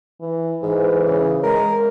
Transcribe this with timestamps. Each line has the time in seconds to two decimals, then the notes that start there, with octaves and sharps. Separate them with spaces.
0.20 E3
0.62 G#2 E3
1.06 C#3
1.43 G#3 A#4